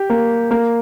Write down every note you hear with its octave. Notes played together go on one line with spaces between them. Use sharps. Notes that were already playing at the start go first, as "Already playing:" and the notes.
Already playing: G4
A#3
A#3